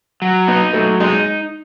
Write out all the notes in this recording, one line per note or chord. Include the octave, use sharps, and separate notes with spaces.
F#3
B3 D#4
F#3 A3
G#3 D#4